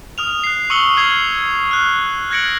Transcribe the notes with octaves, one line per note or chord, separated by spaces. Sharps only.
D#6 F6 F7
F#6 C7
C#6 D#6 E6 C#7 F#7 G7
F6 G#6 C7 F7 F#7
F6 F#6
F#6 G#6 A#6 C#7 D7 F#7